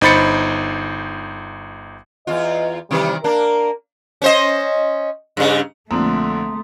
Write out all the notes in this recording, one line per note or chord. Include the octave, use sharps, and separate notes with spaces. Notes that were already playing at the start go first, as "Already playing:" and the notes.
G1 D#4 C5 B5 A6 C#7
E2 F4 D#5
C3 D#3 E3 G3
A#3 D4 A#4
C#4 C5 D#5
G2 C#3
A#1 D3 A3 A#3 C4 A#5 C6 D#6